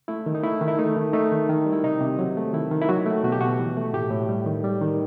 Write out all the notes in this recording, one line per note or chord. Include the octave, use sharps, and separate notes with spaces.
A3 E4
D#3
D#4
A3 E4
D#3
E4
A3 D#4
D#3
A3 D#4
D#3
D#3
G3
E4
C3 D#4
C3
F#3
A3
D#3 E4
D#3
E4
F#3 F#4
A3
B2 F#4
G4
B2 F#4
E3
A3
A2 G4
A2
G3
D#3
G3
D#3